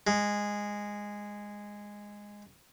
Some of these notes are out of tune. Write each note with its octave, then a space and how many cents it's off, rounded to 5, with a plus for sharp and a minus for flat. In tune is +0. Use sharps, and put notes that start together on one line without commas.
G#3 -10